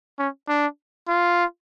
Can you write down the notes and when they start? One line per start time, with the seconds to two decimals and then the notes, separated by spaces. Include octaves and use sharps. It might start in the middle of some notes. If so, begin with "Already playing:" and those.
0.19 C#4
0.49 D4
1.08 F4